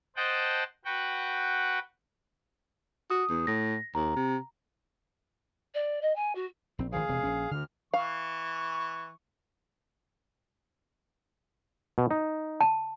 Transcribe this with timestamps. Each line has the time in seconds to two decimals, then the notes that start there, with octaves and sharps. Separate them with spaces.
0.16 C5 D#5 F#5 G5 A5
0.85 F#4 B4 F#5 G5
3.10 F#4 D#6
3.30 E2
3.47 A2 A#6
3.95 D#2 A#5
4.16 C3
5.75 D5
6.02 D#5
6.16 G#5
6.35 F#4
6.79 A#1 C4
6.92 G#1 D#3 F3 G#4 F5
7.08 E1 C3
7.23 A#1 C#4
7.51 D2 D3 F6
7.94 E3 F5 C#6
11.98 B2
12.11 D#4
12.61 A5